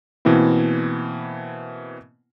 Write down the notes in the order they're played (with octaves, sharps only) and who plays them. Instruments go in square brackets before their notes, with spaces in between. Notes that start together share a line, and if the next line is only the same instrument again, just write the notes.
[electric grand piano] B2 E3 A#3 C4 E4